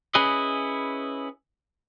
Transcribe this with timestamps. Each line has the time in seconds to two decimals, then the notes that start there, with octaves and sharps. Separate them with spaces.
0.15 C#4 E4 G#4 B4 D#5